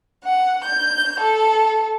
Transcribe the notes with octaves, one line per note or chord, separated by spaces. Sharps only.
F#5
G6
A4